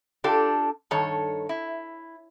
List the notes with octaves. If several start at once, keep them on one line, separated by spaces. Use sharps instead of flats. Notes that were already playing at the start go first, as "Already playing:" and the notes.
D4 F4 G4 A4
G2 D#3 A4 C#5
E4